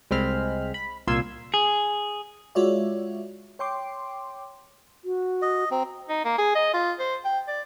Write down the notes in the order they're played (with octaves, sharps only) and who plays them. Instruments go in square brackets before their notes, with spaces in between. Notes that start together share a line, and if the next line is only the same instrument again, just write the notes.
[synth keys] C2 G#3 C4 B5 F6
B5
C2 A#2 F4 C6 E6 G#6
[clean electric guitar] G#4
[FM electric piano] G#3 F4 F#4 C#5 D5 E5
C#5 G5 C6 D6
[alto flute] F#4
[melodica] D#5
[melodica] C4 [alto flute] A#5
[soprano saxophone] D#4
A#3
G#4
D#5
F4
C5
G5
D5